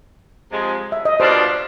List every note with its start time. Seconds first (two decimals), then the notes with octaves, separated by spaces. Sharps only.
0.51 C3 F3 G#3
0.92 E5
1.05 D#5
1.19 B2 G3 A#3 D4 F4 C5 D5